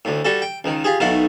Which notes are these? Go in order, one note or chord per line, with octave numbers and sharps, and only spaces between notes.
D2 A2
G3 F#4 A4
G5
C#2 D#3
F4 G4 G#4
B1 A2 D#3 A3 F5 F#5